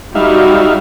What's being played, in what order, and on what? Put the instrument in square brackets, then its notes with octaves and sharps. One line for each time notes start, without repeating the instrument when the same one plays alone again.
[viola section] G3 F#4 [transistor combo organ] D#4 E5 F5